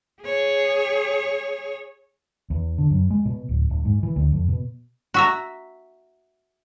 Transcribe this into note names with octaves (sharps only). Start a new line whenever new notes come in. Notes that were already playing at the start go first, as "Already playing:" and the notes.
G#4 C#5
E2
D3
F#2
G#3
B2
D1
D#1
G#2
E3
D2
F2
B2
F#4 E5 A#5